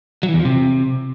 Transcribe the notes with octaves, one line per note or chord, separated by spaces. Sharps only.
F#3
E3
E2
F3
C3